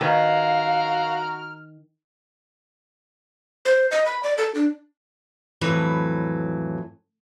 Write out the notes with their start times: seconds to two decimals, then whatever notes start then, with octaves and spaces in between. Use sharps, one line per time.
0.01 D#3 F#4 B4 C#5 F5 A#5 F6
3.65 C5
3.91 D#5
4.05 B5
4.23 D5
4.38 A4
4.55 D4
5.61 F2 A2 E3 F#3 B4